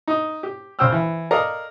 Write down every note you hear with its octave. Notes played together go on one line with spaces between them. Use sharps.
D#4
G4
C#2 C#3 C5 G5 E6 F6
E3
A4 A#4 D5 D#5 F5